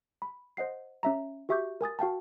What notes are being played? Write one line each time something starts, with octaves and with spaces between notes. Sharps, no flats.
B5
C5 D#5 F#5 C7
C#4 E5 A#5
F#4 G4 E5 C#6 D6 G6
A#4 G#5 D#6 A6
F#4 F5 G5 A5